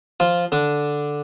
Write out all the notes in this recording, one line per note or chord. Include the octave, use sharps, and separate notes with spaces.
F3 F4
D3 D4